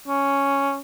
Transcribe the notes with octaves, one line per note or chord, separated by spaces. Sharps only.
C#4